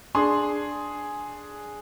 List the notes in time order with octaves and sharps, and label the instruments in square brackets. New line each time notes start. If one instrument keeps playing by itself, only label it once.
[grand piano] D4 G#4 C6